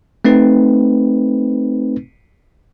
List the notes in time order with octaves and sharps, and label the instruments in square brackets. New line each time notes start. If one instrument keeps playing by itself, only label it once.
[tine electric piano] A3 C4 D#4 B4